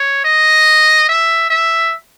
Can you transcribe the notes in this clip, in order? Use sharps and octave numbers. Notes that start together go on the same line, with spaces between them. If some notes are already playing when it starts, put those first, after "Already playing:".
Already playing: C#5
D#5
E5
E5